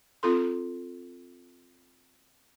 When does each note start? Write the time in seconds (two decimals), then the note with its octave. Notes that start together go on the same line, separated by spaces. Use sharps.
0.23 C4 F4 A4 C6